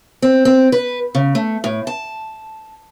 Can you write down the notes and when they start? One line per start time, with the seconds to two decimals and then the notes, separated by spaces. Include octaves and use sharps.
0.22 C4
0.45 C4
0.72 B4
1.15 C#3
1.35 A3
1.64 A2
1.87 A5